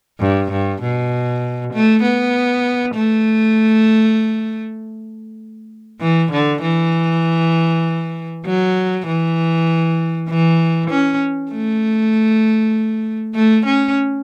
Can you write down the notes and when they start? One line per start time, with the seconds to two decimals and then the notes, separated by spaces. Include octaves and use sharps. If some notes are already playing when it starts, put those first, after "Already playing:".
0.20 G2
0.51 G2
0.82 B2
1.73 A3
2.03 B3
2.94 A3
6.01 E3
6.32 D3
6.62 E3
8.46 F#3
9.06 E3
10.29 E3
10.90 C#4
11.51 A3
13.35 A3
13.66 C#4